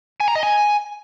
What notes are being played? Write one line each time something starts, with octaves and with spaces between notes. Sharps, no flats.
G#5
A#5
D#5
G#5